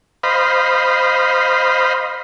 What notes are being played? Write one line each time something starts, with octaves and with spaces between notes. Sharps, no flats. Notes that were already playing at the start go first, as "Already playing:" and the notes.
C5 D#5 F5 B5